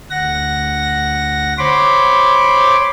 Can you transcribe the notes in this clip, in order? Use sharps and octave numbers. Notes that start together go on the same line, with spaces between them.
D2 F#5 A#6
C5 C#5 B5 C6 D6